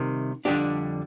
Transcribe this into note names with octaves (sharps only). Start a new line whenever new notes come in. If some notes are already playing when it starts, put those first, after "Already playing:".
Already playing: C2 C3 D#3
F2 D3 G3 D4 G4